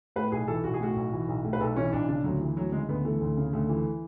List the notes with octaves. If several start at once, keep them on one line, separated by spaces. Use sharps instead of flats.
A2 B4
B1 G#4
E3 A4
B1 F#4
G#4
A2 F#4
B1
E3
B1
A2
B4
B1 A4
E3 C#4
B1 D4
C#3 D4
D2 F#3
E3
D2 F#3
C#3 G#3
D2 B3
E3 A3
D2
C#3
D2 A3
E3